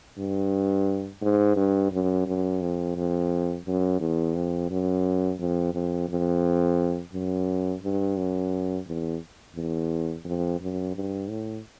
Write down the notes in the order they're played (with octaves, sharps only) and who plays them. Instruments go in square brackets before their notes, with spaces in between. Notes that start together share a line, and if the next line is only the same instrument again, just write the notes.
[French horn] G2
G#2
G2
F#2
F#2
F2
F2
F#2
E2
F2
F#2
F2
F2
F2
F#2
G2
F#2
E2
E2
F2
F#2
G2
A2